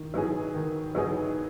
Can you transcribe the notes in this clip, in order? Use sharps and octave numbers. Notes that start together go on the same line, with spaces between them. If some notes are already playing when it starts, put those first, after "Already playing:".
Already playing: D#3
F#3 B3 D#4 G#4
D#3
F#3 B3 D#4 G#4